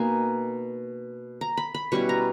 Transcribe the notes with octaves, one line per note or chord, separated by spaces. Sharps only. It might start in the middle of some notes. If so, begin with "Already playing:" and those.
Already playing: B2 A#3 D#4 G#5
A#5
B5
B5
B2 G3 C#4 E4 C#6
A#5